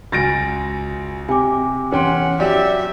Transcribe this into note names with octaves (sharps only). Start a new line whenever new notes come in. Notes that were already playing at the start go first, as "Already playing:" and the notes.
C#2 F#4 G#5 A6 A#6 D7
C3 G#5 D6
E2 C#4 F#5 G5 C6
F#3 G4 D5 E5